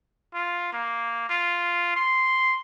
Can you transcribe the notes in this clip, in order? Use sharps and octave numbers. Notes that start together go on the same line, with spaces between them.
F4
A#3
F4
C6